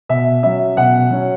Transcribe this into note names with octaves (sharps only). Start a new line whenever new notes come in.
B2 E5
F#3 C#4 E5
B2 F#5
F#3 C#4